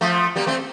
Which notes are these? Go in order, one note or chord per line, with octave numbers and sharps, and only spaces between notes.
F3 A3
G3 A#3
A3 C4